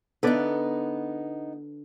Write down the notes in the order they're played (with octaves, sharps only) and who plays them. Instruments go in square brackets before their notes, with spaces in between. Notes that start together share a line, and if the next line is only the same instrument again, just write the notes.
[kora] D3 B4 D5 [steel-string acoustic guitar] B3 D#4